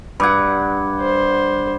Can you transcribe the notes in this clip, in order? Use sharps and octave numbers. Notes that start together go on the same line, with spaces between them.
G2 F#5 B5 D6 G#6
C5